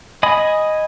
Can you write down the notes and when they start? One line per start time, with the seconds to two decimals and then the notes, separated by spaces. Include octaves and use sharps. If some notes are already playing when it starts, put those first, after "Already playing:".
0.23 D#5 G#5 B5 D#6